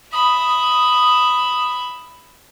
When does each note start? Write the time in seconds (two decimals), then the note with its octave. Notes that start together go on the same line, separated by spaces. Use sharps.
0.13 E5 B5 D#6